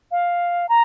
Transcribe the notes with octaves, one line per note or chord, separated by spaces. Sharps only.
F5
A#5